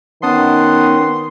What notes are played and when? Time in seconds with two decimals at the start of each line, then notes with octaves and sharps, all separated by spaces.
0.23 D#3 B3 C#4 F#5 A5 C6 D#6